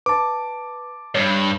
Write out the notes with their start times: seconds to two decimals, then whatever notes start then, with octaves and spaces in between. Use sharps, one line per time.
0.06 B4 A5 D6
1.15 G2 C#5